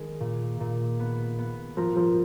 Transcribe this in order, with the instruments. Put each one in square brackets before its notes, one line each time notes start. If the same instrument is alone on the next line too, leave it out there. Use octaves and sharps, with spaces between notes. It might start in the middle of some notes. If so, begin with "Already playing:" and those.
Already playing: [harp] D#3 G#3 A#4
A#2
A#2
B3
B3
[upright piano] F3 [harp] A#4
[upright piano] F3